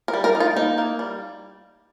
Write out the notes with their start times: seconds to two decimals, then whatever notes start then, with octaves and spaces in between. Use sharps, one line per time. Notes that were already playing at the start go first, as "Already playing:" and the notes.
0.08 A#4
0.14 G3
0.24 A#4
0.35 D#4
0.40 F4
0.56 A#3 D#4
0.78 A#3
0.99 G3